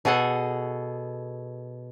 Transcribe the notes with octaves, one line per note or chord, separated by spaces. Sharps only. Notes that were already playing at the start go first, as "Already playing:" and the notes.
B2 G#4 A4 F#5 G#5